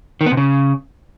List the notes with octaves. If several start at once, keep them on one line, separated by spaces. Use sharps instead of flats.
D#3
B3
C3
C#3